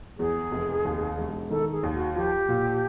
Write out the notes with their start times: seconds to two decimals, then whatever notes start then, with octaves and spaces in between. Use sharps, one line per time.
0.19 E2 G#4
0.52 F1
0.85 D#2
1.18 E1
1.50 D#3 A4
1.72 G#4
1.83 D#2
1.95 F#4
2.16 F3 G4
2.49 A#2